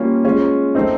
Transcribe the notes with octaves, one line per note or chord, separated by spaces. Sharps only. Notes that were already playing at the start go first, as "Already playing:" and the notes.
Already playing: G3 A#3 C#4 F4
G#3 C#4 F4
A3 C4 D#4